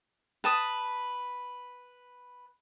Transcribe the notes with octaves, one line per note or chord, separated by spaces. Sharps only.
B4 A5 D#6